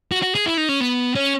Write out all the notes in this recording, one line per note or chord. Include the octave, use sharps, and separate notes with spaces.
F#4
F#4
G#4
E4
D#4
C#4
B3
C#4